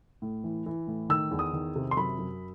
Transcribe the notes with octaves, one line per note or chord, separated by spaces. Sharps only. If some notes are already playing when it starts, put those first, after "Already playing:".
A2
E3
E3
A2
D#3 E6
E2
D#6
D#3
C3
C6
F#2 B5
F#2